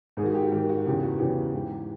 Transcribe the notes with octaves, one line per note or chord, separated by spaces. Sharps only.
G#2 G#4
D#3 F#4
G4
F#4
G#2 D#3 G4
F#4
E2 C#3 E3 G4
F#4
E2 C#3 E3 G4
G#2 E3